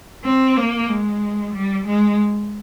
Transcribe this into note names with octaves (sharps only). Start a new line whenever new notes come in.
C4
A#3
G#3
G3
G#3